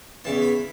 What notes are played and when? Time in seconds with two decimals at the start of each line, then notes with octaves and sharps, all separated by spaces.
0.24 E2 C#3 E3 A5
0.42 B5